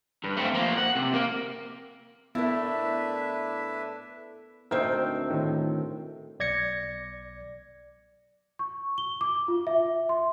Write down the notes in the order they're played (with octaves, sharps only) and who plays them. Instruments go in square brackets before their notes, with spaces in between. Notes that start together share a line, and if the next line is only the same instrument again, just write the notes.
[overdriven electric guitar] G2
A3 C4
F3 A#3
F#5
C3
A#3
[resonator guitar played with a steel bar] A2 A3 [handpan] B3 A#4 [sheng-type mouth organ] D4 B4 E5 [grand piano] E4
[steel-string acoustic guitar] D2 C4 G5 [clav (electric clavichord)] D#4 A#4 E5
[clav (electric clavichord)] A2 D#3
[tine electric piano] B1 D5 G#6 A#6 C#7
[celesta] C#6
G7
D6
F4
E5
C6